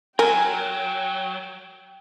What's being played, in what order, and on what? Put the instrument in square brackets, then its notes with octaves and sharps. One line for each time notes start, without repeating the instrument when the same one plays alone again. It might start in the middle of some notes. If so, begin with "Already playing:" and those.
[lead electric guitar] F#3 [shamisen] A#4 [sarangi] G5 [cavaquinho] G#5